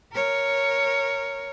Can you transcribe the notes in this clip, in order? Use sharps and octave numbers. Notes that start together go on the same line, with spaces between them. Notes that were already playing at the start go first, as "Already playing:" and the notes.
A#4 C#5